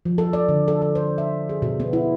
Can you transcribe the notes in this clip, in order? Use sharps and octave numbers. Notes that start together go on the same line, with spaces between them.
F3
A4
D5
D3
A4
A4
C5
E5
G#4
B2
B3
E4